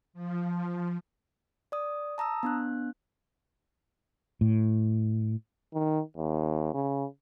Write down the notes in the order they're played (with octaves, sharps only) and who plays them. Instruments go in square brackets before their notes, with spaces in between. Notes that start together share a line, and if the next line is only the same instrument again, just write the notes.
[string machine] F3
[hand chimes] D5 D#6
A5 A#5 D#6 E6
B3 D4 F#6
[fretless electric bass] A2
[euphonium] D#3
D#2
C#3